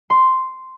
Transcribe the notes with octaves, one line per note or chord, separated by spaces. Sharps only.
C6